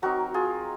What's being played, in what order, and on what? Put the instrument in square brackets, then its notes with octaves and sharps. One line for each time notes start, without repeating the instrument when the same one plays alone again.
[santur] F#3 C4 D#4 F#4 A#4
F4 G#4